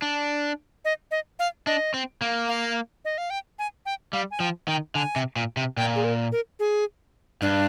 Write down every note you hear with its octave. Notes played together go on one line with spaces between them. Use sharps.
D4
D#5
D#5
F5
D4 D#5
C4
A#3
F5
D#5
F5
G5
G#5
G5
G3 F5
G#5
F3 G5
D#3 G5
D3 G#5
C3
A#2
C3
A#2 G5
G#4
A#4
A#4
G#4
G2 D4